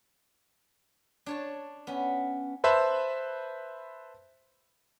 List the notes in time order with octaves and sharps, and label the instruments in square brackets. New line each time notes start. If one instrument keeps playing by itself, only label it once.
[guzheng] D4 C#5 A5
B3 C#4
[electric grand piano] B4 C5 E5 A5 B5